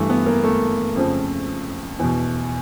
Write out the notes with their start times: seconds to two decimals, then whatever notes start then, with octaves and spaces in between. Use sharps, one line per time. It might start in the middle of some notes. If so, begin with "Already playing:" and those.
Already playing: G2 E3 A3
0.10 B3
0.26 A#3
0.44 A3
0.96 F2 C#3 F3
1.99 E2 B2